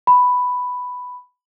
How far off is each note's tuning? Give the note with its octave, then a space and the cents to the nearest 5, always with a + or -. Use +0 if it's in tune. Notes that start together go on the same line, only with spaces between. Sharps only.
B5 +5